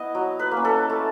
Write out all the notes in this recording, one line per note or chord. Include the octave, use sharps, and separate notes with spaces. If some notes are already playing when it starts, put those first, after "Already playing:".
Already playing: B3 E4 D#5
F#3
B4
A#3
C#4
A4
A3